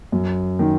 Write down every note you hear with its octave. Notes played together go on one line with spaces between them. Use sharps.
F#2
D#3